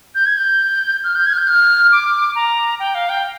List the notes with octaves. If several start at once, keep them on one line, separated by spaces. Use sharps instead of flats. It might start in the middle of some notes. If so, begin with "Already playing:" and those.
G6
G#6
G6
F6
G6
G#6
F6
G6
F6
D6
A#5
G5
F5
G5